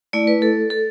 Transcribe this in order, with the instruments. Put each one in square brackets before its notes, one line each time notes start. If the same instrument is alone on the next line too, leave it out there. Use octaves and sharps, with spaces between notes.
[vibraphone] A3 E4 D5
B4
A4
A4